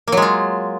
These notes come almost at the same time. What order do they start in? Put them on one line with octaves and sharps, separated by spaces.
A#3 F#3 G#3 F4